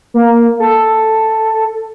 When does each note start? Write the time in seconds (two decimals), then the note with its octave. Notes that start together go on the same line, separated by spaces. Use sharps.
0.14 A#3
0.60 A4